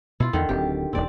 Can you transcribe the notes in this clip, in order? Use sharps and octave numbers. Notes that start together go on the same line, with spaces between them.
B2 E4 F4
E2 D3 D#3
D1 C4 G4
D#1 E2 A#2 C4 D5